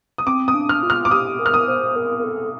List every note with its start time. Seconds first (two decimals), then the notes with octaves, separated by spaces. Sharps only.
0.18 D#6
0.26 C4 D6
0.48 D#6
0.55 D4
0.69 F6
0.83 F4
0.90 F6
1.05 D6
1.11 G4 D#6
1.39 A#4
1.46 F6
1.54 D#6
1.68 C5
1.96 A#4
2.19 A#4
2.24 A4